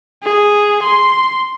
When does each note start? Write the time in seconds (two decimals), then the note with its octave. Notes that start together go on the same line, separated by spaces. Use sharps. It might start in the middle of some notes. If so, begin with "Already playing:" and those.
0.23 G#4
0.83 C6